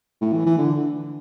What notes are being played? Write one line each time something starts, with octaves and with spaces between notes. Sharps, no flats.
A2
E3
E3
D3